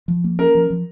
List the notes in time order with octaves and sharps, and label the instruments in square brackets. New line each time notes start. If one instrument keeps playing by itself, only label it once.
[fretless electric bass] F3
A#3
[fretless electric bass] C#4 [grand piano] A#4
[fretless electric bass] F3
F3